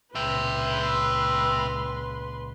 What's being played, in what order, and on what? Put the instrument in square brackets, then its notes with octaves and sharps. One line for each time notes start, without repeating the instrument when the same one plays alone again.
[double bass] C#2 A#2 [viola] B4 C6 [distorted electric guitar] E5 G5